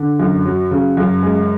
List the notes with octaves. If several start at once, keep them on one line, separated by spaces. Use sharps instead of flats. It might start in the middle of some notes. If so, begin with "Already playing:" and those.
Already playing: D3
F#2
F#3
C#3
F#2
G#3